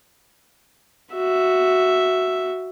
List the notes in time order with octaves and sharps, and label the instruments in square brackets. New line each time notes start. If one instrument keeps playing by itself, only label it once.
[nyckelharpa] F#4 E5